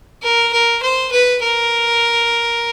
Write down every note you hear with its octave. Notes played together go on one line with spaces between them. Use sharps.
A#4
A#4
C5
B4
A#4